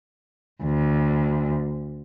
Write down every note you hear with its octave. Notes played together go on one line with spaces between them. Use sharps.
D2